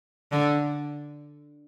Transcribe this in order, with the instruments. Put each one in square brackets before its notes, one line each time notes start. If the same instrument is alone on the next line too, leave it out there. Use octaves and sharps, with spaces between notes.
[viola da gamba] D3